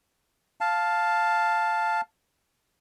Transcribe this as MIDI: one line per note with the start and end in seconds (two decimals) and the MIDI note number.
0.61 2.01 77
0.61 2.01 81